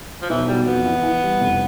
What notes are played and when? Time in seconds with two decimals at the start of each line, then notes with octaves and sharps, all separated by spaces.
0.22 F3
0.29 B1 E3
0.48 B2 G3
0.66 F2 B3
0.86 E3
1.03 E3
1.23 G3
1.41 F1